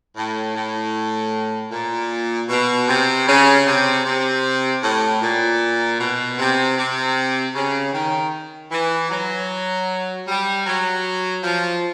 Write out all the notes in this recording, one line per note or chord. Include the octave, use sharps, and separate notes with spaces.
A2
A2
A#2
B2
C3
C#3
C3
C3
A2
A#2
B2
C3
C3
C#3
D#3
E3
F#3
G3
F#3
F3